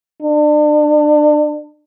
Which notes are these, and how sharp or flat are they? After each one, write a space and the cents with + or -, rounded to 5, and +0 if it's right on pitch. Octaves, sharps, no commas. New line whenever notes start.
D4 +30